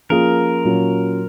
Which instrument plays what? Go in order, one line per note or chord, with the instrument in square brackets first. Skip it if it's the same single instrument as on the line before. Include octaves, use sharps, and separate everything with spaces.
[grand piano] F3 A#3 C#4 F4 G#4 [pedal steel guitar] A#4
[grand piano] A#2 F#3 C#4 F4